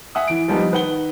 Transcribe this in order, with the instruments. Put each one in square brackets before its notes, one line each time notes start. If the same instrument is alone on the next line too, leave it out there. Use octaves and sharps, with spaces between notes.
[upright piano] E5 F#5 G#5 D#6
E3 D7
F3 G3 B3 D#4
D#3 B4 F#5 G7